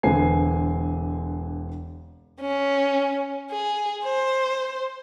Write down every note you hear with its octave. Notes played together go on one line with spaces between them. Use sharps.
E1 D3 C4 B4 G#5 C7
C#4
G#4
C5